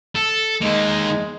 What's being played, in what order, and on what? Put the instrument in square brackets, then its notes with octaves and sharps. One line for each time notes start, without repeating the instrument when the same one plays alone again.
[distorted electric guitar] A4
[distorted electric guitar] D#3 A#3 [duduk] G#3